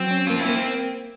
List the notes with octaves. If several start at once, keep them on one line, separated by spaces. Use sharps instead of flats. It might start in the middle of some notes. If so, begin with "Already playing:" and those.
Already playing: F#3 C4
C#4
A#3 F4
E4
A#3